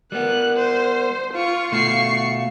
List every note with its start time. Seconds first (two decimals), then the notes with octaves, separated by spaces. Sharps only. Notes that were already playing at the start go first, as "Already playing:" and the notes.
0.12 G3 B3 A#4 F#6
0.56 C5
1.33 F4 F5 C#6
1.72 B2 A3 C#6 C7